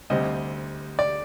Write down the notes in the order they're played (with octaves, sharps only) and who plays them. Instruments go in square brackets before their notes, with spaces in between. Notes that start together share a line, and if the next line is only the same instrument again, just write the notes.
[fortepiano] D2 C3 G3 C4 D#5
D5